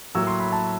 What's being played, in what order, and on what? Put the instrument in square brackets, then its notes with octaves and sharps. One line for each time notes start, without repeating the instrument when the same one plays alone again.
[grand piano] A2 F#3 A#3 E6
C6
B5
A5